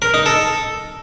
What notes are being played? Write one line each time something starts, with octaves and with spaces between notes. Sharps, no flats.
A#4
D#4
A4